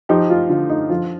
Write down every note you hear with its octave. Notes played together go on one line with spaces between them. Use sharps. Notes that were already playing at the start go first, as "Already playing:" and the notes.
F3 D#4 G4
F4
D3 F4
D#4
F3 F4